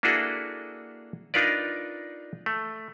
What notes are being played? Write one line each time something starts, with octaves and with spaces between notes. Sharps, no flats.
A#3 D4 E4 F#4 G#4 A4
D4 D#4 F4 A#4 B4 D5
A3